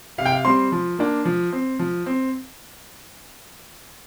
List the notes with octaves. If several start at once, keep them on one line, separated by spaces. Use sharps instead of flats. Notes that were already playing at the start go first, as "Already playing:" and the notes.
C3 F5
G5
F5
G3 C4 C6
F3
A#3 D4
F3
C4
F3
C4